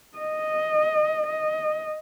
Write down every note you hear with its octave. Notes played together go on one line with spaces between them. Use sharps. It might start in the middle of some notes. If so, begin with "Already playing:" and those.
D#5
D#5